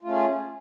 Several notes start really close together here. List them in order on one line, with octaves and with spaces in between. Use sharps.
F4 A3 C#4 G#4